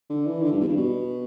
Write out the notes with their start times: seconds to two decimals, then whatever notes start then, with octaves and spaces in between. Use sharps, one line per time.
0.10 D3
0.27 E3
0.43 D3
0.52 G2
0.61 E2
0.68 G2
0.77 B2